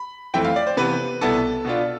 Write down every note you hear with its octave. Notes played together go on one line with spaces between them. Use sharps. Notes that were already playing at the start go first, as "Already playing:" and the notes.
Already playing: B5
F2 E3 A3 C4 E4 G5
F5
D5
C5
C3 E3 B3 B4
C2 B2 B3 E4 A4
B2 B3 D4 F4